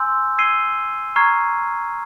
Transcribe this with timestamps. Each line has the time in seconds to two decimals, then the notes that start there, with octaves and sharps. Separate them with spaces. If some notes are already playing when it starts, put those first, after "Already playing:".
Already playing: G#5 C6 E6 G6
0.38 E6 G#6 C7 D#7 G7
1.16 A#5 C#6 F6 G#6 C7